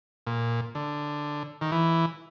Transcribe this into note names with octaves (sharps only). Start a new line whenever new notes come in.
A#2
D3
D#3
E3